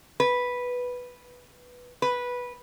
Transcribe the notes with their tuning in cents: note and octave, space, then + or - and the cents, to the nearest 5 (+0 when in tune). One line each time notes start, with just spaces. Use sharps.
B4 -5
B4 -10